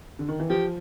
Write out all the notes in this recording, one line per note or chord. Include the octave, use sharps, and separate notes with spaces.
D3
D#3
E3
F3 G4